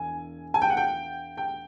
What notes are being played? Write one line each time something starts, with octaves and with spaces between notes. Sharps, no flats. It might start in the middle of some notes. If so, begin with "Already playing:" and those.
Already playing: E1 G#5
G#5
G5
F#5
G5
G5